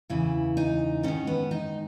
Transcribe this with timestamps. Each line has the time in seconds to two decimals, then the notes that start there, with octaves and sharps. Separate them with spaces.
0.10 E2 C#3 E3 E4
0.57 D#4
1.03 G#2 D#3 C#4
1.27 B3
1.51 D#4